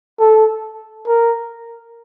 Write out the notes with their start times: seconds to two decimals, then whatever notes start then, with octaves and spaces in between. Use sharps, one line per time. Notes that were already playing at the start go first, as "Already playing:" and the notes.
0.19 A4
1.07 A#4